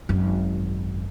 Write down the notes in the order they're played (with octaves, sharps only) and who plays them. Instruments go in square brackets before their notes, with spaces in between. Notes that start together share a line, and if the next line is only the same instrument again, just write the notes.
[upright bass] G#1 F#2